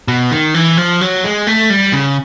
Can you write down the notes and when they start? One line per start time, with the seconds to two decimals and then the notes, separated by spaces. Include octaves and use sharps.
0.08 B2
0.31 D#3
0.54 E3
0.77 F3
1.01 F#3
1.24 G#3
1.47 A3
1.70 G3
1.93 C#3